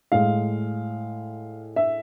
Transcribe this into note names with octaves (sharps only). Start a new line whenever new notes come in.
A2 G#3 F5
E5